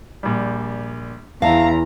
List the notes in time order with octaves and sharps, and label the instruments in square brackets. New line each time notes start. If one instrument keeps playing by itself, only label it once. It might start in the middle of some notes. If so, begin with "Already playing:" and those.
[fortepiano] A#1 G3
[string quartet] E2 A#5 [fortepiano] E5 A5 [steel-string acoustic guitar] F5